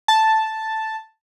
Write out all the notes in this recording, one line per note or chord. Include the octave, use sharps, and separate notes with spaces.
A5